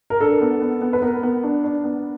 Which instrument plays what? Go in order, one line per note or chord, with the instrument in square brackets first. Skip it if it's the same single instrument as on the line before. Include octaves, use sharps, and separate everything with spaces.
[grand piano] A#4
[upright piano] D4 [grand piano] A4
[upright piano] B3
B3
B3
[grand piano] B4
[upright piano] B3 [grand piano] A#4
[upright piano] B3
D4
D4
B3